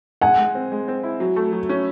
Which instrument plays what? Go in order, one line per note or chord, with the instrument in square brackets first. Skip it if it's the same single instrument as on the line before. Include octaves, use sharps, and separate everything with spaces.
[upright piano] G#3 [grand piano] F#5 G#5
[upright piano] G#3
C4
G#3
C4
E4
F#3
A3
F#3
C#4